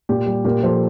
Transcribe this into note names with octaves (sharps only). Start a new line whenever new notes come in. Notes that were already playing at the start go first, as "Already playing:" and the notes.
A#2 G4
G3
A#2 G4 A#4
F3 A4 C5